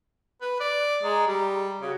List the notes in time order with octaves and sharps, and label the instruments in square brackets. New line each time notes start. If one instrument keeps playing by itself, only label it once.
[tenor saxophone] B4
D5
[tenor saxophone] G#3 [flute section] A#5
[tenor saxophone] G3
[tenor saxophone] C#3 [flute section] F#4